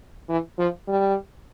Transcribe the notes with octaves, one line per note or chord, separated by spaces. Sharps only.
E3
F3
G3